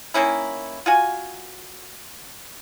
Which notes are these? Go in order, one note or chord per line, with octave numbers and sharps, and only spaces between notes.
D#3 A#3 C#4 E4
F4 F#4 G#5